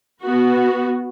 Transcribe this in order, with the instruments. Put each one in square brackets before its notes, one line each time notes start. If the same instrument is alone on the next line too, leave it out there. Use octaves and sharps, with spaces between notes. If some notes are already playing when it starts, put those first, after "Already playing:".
[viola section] B3 F#4